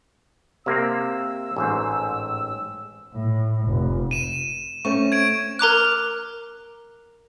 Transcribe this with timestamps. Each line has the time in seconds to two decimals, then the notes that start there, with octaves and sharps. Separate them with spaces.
0.66 C3 A#3 C4 E6
1.56 A1 G#2 C5
3.13 A2
3.66 F1
4.11 D#7 E7
4.85 A3 C4 C#4 C#6
5.12 G#6 D7
5.59 A#4 A#5 D6 F#6